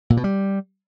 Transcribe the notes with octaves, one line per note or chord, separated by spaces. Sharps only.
A#2
B2
G3